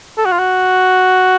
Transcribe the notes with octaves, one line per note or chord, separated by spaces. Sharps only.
A4
F#4
F4
F#4